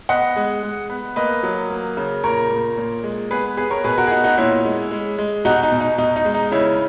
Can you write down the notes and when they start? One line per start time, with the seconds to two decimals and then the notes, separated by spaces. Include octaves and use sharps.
0.09 B3 D#5 F#5
0.36 G#3
0.63 G#3
0.90 B3
1.16 A#3 B4 D#5
1.43 F#3
1.70 A#3
1.97 C#3
2.24 A#2 A#4 C#5
2.51 A#2
2.78 A#2
3.04 G#3
3.31 B3 G#4 B4
3.57 B3 G#4 B4
3.71 A#4 C#5
3.84 B2 G#4 B4
3.98 F#4 A#4
4.07 G#4
4.11 B3 D#4 F#4
4.24 D#4 F#4
4.38 A#2 C#4 E4
4.65 G#3
4.92 G#3
5.18 G#3
5.45 B2 D#4 F#4
5.63 D#4
5.72 B2
5.80 D#4
5.98 B2 D#4
6.16 D#4
6.25 G#3
6.34 D#4
6.52 C#3 C#4 E4